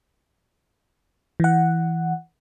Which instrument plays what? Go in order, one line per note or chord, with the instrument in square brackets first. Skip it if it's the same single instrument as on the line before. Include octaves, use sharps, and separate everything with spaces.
[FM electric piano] E3 F#5